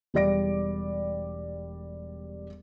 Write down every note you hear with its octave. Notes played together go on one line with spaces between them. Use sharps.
E1 G3 G4 D5 A#6 D7